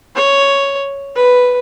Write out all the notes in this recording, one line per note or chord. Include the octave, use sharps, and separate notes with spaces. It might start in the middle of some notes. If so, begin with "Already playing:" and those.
C#5
B4